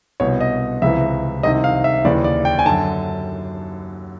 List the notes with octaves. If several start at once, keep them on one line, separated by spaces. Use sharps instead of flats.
C2 B2 C#5
D#5
C#2 C3 E3 E5
C2 C3 D#3 D#5
F5
E5
D#2 C#3 E3 D5
D5
G5
G#5
F#2 D3 A5